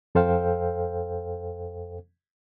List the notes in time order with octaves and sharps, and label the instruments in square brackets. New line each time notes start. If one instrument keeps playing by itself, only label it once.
[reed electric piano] F2 A4 C5 F5 G5